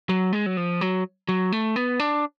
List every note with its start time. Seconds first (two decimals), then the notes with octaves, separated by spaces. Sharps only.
0.09 F#3
0.33 G#3
0.46 F#3
0.57 F3
0.81 F#3
1.29 F#3
1.52 A3
1.76 B3
2.00 D4